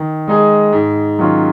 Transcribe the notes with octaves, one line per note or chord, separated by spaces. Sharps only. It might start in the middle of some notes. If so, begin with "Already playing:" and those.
Already playing: D#3
G#3 D#4 G#4
G#2
D#3 F#3 C#4 F4